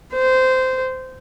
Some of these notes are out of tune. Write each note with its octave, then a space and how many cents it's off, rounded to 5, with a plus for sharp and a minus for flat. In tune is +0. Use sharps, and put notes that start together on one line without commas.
C5 -15